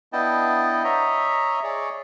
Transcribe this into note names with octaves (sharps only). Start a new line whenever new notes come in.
B3 D4 E4 D#5 G5 A5
C#5 D#5 E5 A#5
G#4 C#5 D5